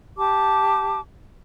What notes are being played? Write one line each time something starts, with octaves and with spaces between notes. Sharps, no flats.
G4 A5 D6